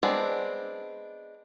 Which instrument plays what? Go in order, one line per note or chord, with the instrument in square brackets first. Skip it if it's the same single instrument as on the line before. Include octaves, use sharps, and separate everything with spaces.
[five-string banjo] G#3 B3 C4 D4